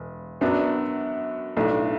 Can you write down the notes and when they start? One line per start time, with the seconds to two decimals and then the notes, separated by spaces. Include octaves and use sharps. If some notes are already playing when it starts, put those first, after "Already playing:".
Already playing: E1
0.41 F#2 F#3 B3 D4 F#4
1.57 B1 A2 A3 D4